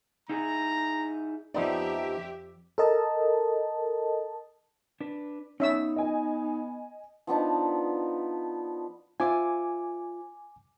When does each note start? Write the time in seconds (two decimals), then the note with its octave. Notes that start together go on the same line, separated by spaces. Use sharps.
0.29 D#4 E4 G#4 A#5
1.54 F2 F3 B3 D#4 G4 D5 E5
2.78 A4 A#4 D#5 A5
5.01 D4 B4
5.60 B3 C#4 D#4 E5 E6
5.96 D#5 G#5
7.27 F3 B3 D4 D#4
9.20 F4 C5 E5 G#5 D6